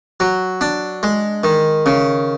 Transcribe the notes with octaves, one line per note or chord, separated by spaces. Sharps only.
F#3
D4
G#3
D#3
C#3